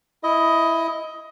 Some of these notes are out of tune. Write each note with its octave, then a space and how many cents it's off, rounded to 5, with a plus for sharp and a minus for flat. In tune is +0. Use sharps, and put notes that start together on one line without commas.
E4 +0 D#5 +15